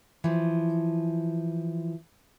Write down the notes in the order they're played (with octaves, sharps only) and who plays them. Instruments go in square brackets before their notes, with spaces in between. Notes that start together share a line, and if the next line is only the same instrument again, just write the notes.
[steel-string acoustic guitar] E3 F3